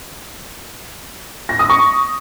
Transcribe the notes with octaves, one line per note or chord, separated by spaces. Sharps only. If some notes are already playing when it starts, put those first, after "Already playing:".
A#6
D#6
C#6